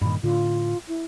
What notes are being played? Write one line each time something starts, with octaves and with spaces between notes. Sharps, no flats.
G2 A#2 D#3 B5
A2 D3 F4
E4